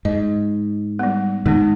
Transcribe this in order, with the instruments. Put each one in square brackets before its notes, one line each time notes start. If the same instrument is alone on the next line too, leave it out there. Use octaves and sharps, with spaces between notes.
[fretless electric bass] G#2 [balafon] D#5
[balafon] G3 B3
[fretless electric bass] G#2 D#3 [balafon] G#3 B3 D#4